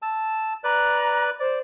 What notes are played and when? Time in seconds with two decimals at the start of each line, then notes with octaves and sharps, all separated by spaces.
0.02 A5 E6
0.64 B4 D5 A#5 F#6
1.40 C5 D5